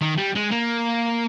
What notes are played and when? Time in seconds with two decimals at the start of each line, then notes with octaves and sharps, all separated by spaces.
0.01 D#3
0.18 G3
0.36 G#3
0.52 A#3